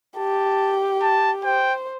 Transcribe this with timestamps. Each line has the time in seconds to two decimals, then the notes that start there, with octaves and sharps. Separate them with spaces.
0.17 G4 A5
1.02 A5
1.44 C5 G5